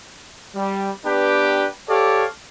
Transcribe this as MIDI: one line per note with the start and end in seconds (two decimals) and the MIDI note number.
0.55 0.90 55
1.05 1.67 59
1.05 1.67 62
1.05 1.67 67
1.05 1.67 71
1.05 1.67 79
1.89 2.26 67
1.89 2.26 69
1.89 2.26 73
1.89 2.26 74
1.89 2.26 77